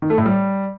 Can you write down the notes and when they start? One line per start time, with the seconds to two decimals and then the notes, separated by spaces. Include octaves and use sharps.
0.02 D#3
0.10 A3
0.18 A2
0.26 G3